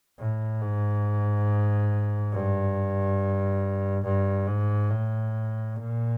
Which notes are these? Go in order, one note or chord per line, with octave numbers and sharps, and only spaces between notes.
A2
G#2
G2
G2
G#2
A2
A#2